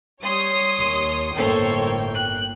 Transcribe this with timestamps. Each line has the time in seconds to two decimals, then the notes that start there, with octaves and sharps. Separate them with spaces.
0.23 G3 C#5 C6 D#6
0.78 D#2
1.35 G1 A2 A#3 A4 C5 C#5 G5
2.13 F#6